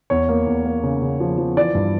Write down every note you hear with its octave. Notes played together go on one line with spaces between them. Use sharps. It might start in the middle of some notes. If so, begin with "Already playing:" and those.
E2 C#5
A#3
E2
A#3
C#3
C#3
F3
F3
E3 D5
G2